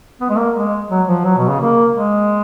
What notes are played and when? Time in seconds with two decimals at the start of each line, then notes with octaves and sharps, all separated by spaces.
0.21 B3
0.29 G#3
0.37 A#3
0.55 G#3
0.90 F#3
1.08 F3
1.25 F#3
1.37 B2
1.49 C#3
1.60 A#3
1.95 G#3